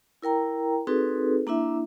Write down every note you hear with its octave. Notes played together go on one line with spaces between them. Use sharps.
E4 A#4 G5 A#5
C4 D#4 F#4 G#4 A4 B4
A#3 D4 E4 E5